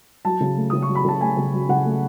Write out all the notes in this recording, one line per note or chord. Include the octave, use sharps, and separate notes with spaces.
F#3 A5
C#3
A3
C#3 D#6
C#6
F#3
B5
C#3 A5
A3 G#5
C#3
F#3
C#3 F#5
A3